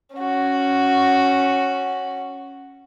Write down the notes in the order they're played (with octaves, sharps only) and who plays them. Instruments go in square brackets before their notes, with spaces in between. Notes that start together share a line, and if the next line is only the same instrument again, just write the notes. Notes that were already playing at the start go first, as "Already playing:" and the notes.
[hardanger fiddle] C#4 F#4